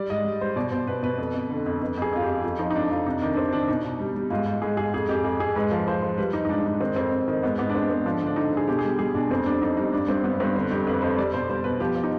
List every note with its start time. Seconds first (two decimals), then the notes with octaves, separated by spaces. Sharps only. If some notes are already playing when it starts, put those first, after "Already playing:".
Already playing: G3 D5
0.10 G#2 D#5
0.24 G3
0.41 G3 C5
0.56 B2 D5
0.72 B2 C5
0.87 B2 B4
1.03 B2 B4
1.18 F2
1.34 F2
1.50 D3
1.66 F2
1.82 F2 B4
1.97 F2 G#4
2.13 F2 F4
2.22 G4
2.28 F2
2.44 F2 F4
2.59 F3 D#4
2.71 D#4
2.75 F2 D4
2.90 F2 F4
3.06 C3 D#4
3.22 D#3 D4
3.34 D4
3.37 C3 C4
3.52 D#3 D4
3.68 B2 D#4
3.84 B2
3.99 G3
4.16 G3
4.30 G#2 F4
4.46 G#2
4.62 G#2 G#4
4.77 G#2 G#4
4.94 F2 G#4
5.09 F2 G4
5.24 F2 G#4
5.40 F2 G#4
5.55 G#2 B4
5.72 F3
5.88 F3 C5
6.02 F3
6.18 G3 B4
6.33 G3 D#4
6.45 D#4
6.49 G#2 D4
6.66 G#2 D4
6.80 D#3 C4
6.96 F2 C4
7.11 F2
7.28 D#3
7.43 G#2 B3
7.58 G#2 B3
7.69 D4
7.75 G#2 C4
7.90 G#2 C4
8.05 F3 D4
8.21 D3
8.26 D4
8.36 D3 D#4
8.52 D3 G#4
8.67 B2 G4
8.79 G#4
8.84 G3 G4
8.99 G3 G#4
9.15 B2 D4
9.31 F2 C4
9.46 G3 D4
9.62 F2 D#4
9.77 G3 D#4
9.92 G2 D4
10.08 G2 C4
10.24 G2 B3
10.40 G2 C4
10.56 D3 C4
10.70 F2 G4
10.87 F2 B4
11.02 F2 C5
11.18 G3 D5
11.34 B2 C5
11.50 G3 C5
11.64 B2 B4
11.80 F3 G4
11.96 F3
12.03 D#4